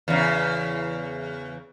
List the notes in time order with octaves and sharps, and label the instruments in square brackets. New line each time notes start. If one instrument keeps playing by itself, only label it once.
[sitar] E2 C#3